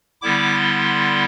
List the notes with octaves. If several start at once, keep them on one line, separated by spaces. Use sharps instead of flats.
D3 G3 B3 E4 D6
C6